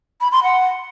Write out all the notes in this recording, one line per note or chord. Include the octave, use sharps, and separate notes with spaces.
B5
C6
F#5